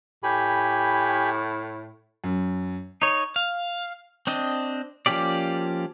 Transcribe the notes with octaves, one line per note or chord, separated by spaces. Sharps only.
A2 G4 G#5 B5
F#2
D#4 C#5
F5
C4 D4 D#5
F3 A#3 C#4 G4 D5